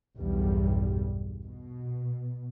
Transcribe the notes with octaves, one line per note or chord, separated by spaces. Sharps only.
B1 E2 G2 G3
B2